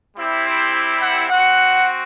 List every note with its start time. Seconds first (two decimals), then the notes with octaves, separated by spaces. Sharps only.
0.16 G3 C4 E4 G4
0.45 C5
0.73 G5
1.02 F#5
1.30 C4 F#4 F#5